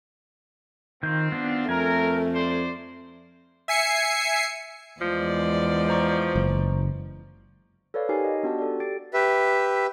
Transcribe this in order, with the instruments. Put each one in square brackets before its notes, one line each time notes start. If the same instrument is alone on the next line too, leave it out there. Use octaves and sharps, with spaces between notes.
[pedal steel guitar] D#3 G6 [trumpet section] C4 F4
[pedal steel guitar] B3 D4
[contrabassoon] F2 [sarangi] A3 [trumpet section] A#4 [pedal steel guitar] G#5
[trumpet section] C5 D5
[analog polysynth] E5 G#5 C7 C#7
[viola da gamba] E2 G#3 D5 [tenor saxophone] F3
[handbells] C5 A#5 C#6
[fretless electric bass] F#1
[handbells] A4 B4 C#5 D5 F5
D#4 G4 A#4 C#5 G#5 C7
D#5
B3 D4 F#4 G4 F#5 A5
A4 D5
G4 A6 D7
[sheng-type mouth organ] G4 B4 E5